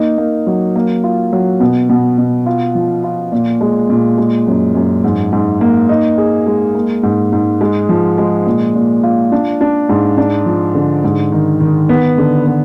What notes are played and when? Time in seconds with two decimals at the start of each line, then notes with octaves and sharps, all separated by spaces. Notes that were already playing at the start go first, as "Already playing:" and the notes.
Already playing: A#3 D#4
0.18 A#3
0.47 F#3
0.75 A#3
1.04 F4
1.33 F#3
1.60 B2
1.89 B2
2.18 B2
2.46 F4
2.75 F3
3.04 F4
3.32 A#2
3.61 G#3
3.90 A#2
4.18 G#3
4.47 F#2
4.75 F#2
5.04 G#2
5.32 G#2
5.61 A#3
5.89 D#4
6.18 G#4
6.46 G#3
6.75 A#3
7.03 G#2
7.32 G#2
7.61 G#3
7.89 F3
8.18 G#3
8.46 A#2
8.75 A#2
9.03 F4
9.32 D4
9.61 D4
9.89 G#2
10.18 D4
10.46 F3
10.75 D3
11.04 G#2
11.32 D#3
11.60 D#3
11.89 B3
12.18 D3
12.46 B3